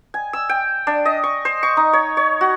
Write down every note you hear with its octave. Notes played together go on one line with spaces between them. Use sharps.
G#5
E6
G5
D4
D#5
C#6
C5
C#6
D#4
C#5
C#5
F#4